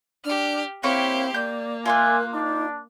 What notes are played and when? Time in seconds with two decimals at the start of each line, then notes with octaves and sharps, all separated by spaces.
0.25 D4 G4 F6
0.83 A#3 C4 E4 G4 C#5 C6 C#6
1.35 A#3 D5 G6
1.86 F4 A#4 D5 E5 G#5 C6 F#6
2.33 D4 D#4